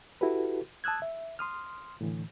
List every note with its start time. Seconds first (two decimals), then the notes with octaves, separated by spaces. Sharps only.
0.21 E4 F#4 G4 A4 B4
0.84 A5 D#6 E6 F#6 G#6
1.02 E5
1.39 C6 D#6 F6
2.01 A2 D3 E3